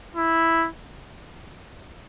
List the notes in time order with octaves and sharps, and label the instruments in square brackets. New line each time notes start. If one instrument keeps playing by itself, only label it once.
[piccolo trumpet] E4